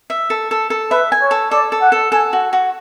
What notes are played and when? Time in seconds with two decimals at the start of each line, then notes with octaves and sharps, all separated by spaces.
0.10 E5
0.30 A4
0.51 A4
0.70 A4
0.91 B4 E5
1.12 G#5
1.22 C#5
1.31 A4
1.51 A4 D5
1.72 A4
1.82 F#5
1.92 A4
2.12 A4 G#5
2.33 F#4
2.53 F#4